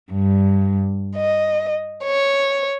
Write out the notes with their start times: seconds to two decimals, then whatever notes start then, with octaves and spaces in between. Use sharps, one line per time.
0.14 G2
1.15 D#5
2.04 C#5